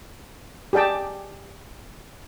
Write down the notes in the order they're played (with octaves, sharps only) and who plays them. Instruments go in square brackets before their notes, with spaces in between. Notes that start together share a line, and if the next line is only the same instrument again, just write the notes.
[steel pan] G4 G#4 D5 G5 A5